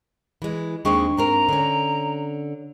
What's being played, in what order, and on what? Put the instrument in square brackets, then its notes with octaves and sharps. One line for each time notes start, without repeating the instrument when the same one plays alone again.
[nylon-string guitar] E3 G#3
[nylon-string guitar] D#2 G#3 C4 [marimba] D4 G5 C#6
[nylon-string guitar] G#2 C4 A#4 [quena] A#5
[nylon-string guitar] D3 C#4